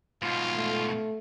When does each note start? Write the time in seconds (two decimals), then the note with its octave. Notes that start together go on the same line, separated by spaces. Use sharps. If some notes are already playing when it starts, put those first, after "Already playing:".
0.22 G#2 B2 F4
0.55 A3